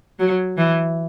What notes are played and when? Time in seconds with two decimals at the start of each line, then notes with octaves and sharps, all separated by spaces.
0.19 F#3
0.57 E3